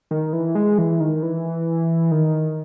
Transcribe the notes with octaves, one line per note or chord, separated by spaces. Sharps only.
D#3
E3
G#3
E3
D#3
E3
D#3